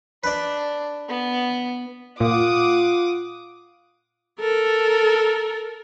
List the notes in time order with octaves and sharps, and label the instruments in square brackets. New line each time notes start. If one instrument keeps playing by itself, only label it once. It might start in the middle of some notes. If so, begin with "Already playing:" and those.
[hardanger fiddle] D4 [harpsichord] B4 D5
[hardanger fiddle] B3
[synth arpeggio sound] A#2 [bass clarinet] F4 [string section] F#5 D6 D#6
[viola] A4 A#4